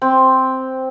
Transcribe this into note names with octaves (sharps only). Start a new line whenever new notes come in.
C4